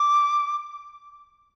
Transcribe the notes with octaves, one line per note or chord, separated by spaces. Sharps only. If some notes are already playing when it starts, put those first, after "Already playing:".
Already playing: D6